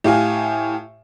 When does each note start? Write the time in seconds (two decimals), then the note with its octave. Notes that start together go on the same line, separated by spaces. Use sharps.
0.04 A2 G4 F5 G#5